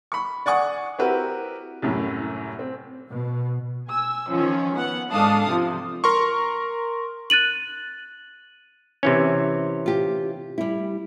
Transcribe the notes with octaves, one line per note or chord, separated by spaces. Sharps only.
B5 C#6
D5 F#5 G#5 C#6 D#6
C4 E4 F#4 G4 A#4 B4
C2 F#2 A2
C4
B2
G#5 E6
D#3 F3 C#4
B3 F#5
G#2 D4 A4 F5 A5 D#6
C3 F3
A#4 C6 C#6
F#6 A6 D#7 F#7
C3 E3 C#4
F4 G4
G3 E4